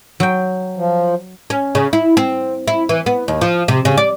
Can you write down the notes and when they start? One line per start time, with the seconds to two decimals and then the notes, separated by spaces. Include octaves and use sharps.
0.20 F#3 G5
0.77 F3
1.50 C#4
1.75 C#3
1.93 E4
2.17 C4
2.67 E4
2.89 E3
3.06 B3
3.28 D#2
3.41 F3
3.68 C3
3.85 C#3
3.97 D5